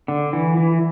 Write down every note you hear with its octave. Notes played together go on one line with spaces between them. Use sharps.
D3
E3
E3